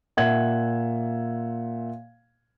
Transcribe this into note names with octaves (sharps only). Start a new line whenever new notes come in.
A#2 E5 F#5 G#6 F#7